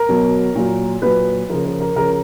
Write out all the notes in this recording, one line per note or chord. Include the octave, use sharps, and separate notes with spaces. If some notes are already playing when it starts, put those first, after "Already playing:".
Already playing: A#4
B2 F#3
A#2 F#3
A#2 F#3 B4
C#3 F3 A#4
A#4
A#4
C#3 F3 A#4